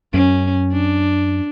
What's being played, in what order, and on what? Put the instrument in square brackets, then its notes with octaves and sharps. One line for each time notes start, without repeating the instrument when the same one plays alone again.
[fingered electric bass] F#2 [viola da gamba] C#4
[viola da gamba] D4